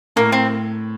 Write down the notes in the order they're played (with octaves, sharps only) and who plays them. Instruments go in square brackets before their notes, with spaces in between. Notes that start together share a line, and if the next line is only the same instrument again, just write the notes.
[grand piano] A2 [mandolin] A#3
[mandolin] C4